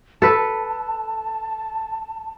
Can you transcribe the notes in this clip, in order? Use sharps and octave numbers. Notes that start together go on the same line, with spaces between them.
A4 B4 A5